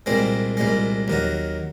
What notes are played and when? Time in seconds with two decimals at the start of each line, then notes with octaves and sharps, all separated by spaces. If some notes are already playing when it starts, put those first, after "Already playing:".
0.06 C2 A#2 G#3 C4
0.57 C2 A#2 G#3
1.08 D#2 D#3 F#3